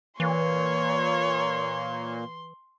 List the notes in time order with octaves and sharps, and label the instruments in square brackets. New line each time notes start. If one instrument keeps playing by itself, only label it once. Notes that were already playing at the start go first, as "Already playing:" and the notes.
[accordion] A#2 A#3 [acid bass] E3 [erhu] C#5 [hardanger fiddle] C6